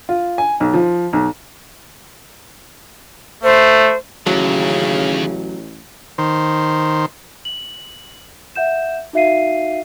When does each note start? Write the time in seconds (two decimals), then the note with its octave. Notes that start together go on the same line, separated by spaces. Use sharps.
0.09 F4
0.38 G#5
0.60 B1
0.74 F3
1.13 B1
3.43 A3 C5
4.27 A1 D#2 C#3 F#3
6.18 D#3 C5
7.45 F#7
8.55 E5 F#5 G6 E7
9.13 D#4 F#4 E5 F5 C7 D#7